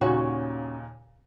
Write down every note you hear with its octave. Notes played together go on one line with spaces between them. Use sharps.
D#2 A#2 C#3 C#4 F#4